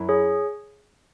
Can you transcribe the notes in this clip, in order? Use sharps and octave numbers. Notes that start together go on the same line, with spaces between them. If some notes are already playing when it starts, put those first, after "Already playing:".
Already playing: F#2 F#3 E4
G#4 C#5